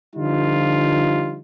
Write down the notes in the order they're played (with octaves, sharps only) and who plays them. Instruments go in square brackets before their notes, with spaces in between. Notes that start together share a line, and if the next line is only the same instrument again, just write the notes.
[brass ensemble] D3 F3 G3 D#4 F4